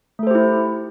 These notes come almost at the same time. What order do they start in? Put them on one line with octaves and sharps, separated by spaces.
A3 A4 C5 G4 E4